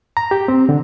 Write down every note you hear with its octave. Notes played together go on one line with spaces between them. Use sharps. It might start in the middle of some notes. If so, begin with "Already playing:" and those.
A#5
G4
C4
D3